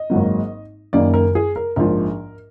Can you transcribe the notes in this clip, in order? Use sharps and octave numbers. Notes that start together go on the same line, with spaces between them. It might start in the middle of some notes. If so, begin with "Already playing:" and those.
Already playing: D#5
G#1 G#2 F#3 A#3
F#1 F#2 D#3 F#3 A#3 D5
A#4
G#4
A#4
A#1 G#2 F3 A#4